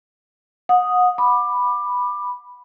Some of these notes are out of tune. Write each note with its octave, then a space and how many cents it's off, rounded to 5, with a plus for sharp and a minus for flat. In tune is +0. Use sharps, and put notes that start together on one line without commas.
F#5 -30 D#6 +0
B5 +0 D6 +20